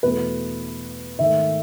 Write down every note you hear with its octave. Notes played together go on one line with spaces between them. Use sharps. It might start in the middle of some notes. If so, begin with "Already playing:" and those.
E2 B2 A3 B4
G#2 D#3 A3 E5